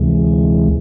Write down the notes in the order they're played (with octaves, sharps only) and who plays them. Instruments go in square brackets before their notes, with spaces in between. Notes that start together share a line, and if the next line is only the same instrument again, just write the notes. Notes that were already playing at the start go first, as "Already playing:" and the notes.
Already playing: [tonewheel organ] D2 C3 E3 G#3